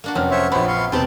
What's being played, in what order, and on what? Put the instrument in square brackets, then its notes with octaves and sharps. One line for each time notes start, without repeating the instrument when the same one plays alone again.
[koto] A#3 D4 F#4
[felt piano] F1 C#4 F6 [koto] F#3 C4
[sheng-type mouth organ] C5 C#5 E5
[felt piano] A#1 B5 [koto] B3 C4 [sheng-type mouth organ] C5 C#5
[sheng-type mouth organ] F5 C6 C#6
[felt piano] E1 C3 [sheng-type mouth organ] B3 G5 A5 [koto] C4 G4 D5